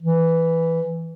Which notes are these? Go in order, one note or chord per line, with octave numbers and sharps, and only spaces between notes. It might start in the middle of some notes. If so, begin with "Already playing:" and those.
E3